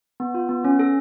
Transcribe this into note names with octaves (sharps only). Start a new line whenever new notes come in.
B3
F4
B3
C#4
A4